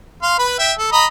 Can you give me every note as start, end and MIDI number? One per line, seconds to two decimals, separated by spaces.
0.22 0.36 77
0.22 0.36 84
0.39 0.55 71
0.39 0.55 83
0.59 0.72 76
0.59 0.72 79
0.79 0.89 69
0.92 1.06 75
0.92 1.06 82
0.92 1.06 83